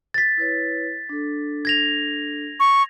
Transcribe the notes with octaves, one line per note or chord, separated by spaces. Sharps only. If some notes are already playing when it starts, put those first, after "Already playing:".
A6 B6
E4 B4 C#5
D4 A4
G#6 A#6 F7
C#6